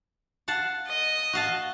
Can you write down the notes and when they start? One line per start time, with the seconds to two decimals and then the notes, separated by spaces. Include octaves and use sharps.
0.48 F5 F#5 A5
0.88 D#5
1.33 F#4 F5 A5